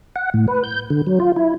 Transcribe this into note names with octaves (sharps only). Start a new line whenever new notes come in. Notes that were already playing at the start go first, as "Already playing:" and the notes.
F#5
A2
B4
G6
D3
F#3
F4
E4